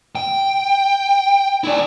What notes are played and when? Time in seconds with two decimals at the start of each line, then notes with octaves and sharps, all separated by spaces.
0.15 G5
1.64 E4 D5